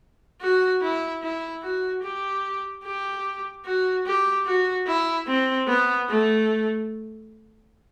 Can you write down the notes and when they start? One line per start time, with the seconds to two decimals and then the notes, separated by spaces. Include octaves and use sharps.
0.41 F#4
0.82 E4
1.22 E4
1.63 F#4
2.03 G4
2.84 G4
3.65 F#4
4.06 G4
4.46 F#4
4.87 E4
5.27 C4
5.68 B3
6.08 A3